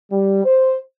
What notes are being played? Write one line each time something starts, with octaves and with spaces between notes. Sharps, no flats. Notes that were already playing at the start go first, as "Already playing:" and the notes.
G3
C5